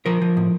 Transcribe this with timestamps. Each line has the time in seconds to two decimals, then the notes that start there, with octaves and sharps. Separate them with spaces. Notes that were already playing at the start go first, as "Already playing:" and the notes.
0.06 F3 A#4
0.21 F3
0.37 A2